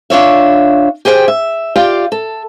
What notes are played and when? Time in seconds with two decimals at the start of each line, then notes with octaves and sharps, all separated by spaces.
0.10 D4 F4 C#5 E5
1.05 G4 G#4 C5 E5 G5
1.28 E5
1.76 F4 G4 D5 F5
2.12 A4